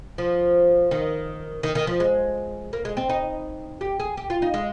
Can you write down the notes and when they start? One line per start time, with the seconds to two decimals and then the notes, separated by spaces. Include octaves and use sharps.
0.18 F3
0.91 D#3
1.63 D#3
1.75 D#3
1.87 F3
2.00 G#3
2.73 A#3
2.85 G#3
2.97 C4
3.09 D#4
3.81 G4
4.00 G#4
4.17 G4
4.30 F4
4.42 D#4
4.54 G#3